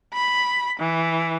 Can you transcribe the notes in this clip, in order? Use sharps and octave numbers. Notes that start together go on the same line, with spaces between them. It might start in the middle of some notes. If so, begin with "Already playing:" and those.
B5
E3